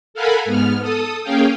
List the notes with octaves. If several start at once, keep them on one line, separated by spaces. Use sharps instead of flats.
A4 A#4 F5 F#5 G#5 B5
G#2 B3 F6
A4 D#6
A#3 C#4 G#4 F5 G5